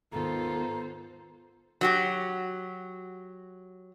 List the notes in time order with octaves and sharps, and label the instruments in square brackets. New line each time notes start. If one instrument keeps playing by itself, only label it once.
[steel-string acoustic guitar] D#2 G#2 D#3 [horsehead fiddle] B3 C5 [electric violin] F4 A4 [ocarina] A#5
[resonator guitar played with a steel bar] F#3 F#4 G4